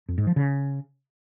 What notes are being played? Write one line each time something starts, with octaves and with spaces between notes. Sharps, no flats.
F2
G#2
F3
C#3